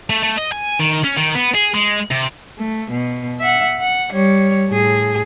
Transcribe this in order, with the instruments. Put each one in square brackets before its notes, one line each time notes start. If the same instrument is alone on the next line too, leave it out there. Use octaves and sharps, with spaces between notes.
[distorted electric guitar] A3
A3
D#5
G#5
D#3
C#4
D#3
B3
G#4
G#3
C3
[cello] A3
B2
E5 F#5
F#5
G3 C#5
A2 G#4